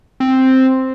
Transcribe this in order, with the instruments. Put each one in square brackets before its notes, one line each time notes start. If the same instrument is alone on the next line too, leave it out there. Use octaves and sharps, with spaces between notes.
[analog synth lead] C4